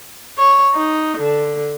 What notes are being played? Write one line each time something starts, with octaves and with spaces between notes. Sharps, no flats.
C#5
D#4
D3